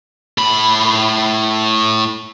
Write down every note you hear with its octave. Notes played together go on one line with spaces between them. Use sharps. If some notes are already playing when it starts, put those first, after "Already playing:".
A2 B5